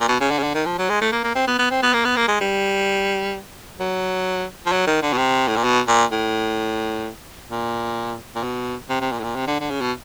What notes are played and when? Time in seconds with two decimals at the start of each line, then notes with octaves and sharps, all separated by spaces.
0.01 A#2
0.08 B2
0.20 C#3
0.31 D3
0.38 C#3
0.43 D3
0.54 D#3
0.65 F3
0.78 F#3
0.89 G#3
1.01 A3
1.12 A#3
1.23 A#3
1.35 C4
1.47 B3
1.58 B3
1.71 C4
1.82 B3
1.93 A#3
2.05 B3
2.16 A#3
2.28 G#3
2.40 G3
3.79 F#3
4.65 F3
4.72 F#3
4.86 D#3
5.02 D3
5.13 B2
5.17 C3
5.47 A2
5.56 A#2
5.64 B2
5.88 A#2
6.11 A2
7.50 A#2
8.35 A#2
8.43 B2
8.89 C3
9.01 C3
9.12 A#2
9.19 A2
9.23 A#2
9.35 C3
9.47 D3
9.60 D3
9.70 C#3
9.81 B2